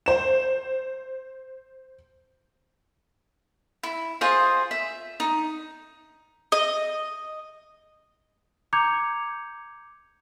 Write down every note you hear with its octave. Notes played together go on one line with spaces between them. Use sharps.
C5 E7
E4
F4 G#4 C5 D#5
E5
D#4
D#5
A#5 D6 G6 G#6 C#7 F7